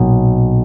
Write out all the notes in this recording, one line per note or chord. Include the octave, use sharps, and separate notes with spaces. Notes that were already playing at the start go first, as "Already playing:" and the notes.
Already playing: B1 A#2